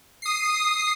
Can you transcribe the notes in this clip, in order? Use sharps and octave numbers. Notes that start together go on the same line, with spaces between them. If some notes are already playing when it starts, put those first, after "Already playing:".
D#6 C7